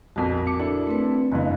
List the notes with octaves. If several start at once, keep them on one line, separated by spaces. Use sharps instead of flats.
A#1 F2 F#4 A#4 B6
D6 C#7
D4 E4 A4
A3 C4 B4
F#1 G2 E3 D#5 F5